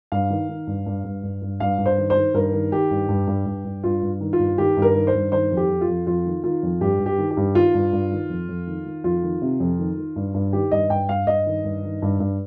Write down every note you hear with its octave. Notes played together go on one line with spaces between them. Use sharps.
G2 F5
D#3
D#3
G2
G2
G2
G2
G2
G2 F5
G2
C5
D#3
C5
D#3
G2 A#4
D#3
D#3 G4
G2
G2
G2
G2
G2
G2 F4
G2
D#3
F4
G2
D#3 G4
G2
A#4
D#3
C5
G2
D#3 C5
F2
G4
F2
F4
F2
F2 F4
D#3
D#3 F4
F2
G2 G4
G2
G4
D#3
G4
G2
D#3 F4
G2
G2
D#3
F2
F2
D#3
D#3
F2 F4
D#3
C3
F2
D#3
D#3
G2
G2
D#3 G4
G2 D#5
G2 G5
G2 F5
G2 D#5
D#3
G2
D#3
G2
G2